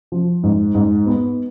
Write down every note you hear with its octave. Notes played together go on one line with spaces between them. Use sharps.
F3
G#2
G#2
B3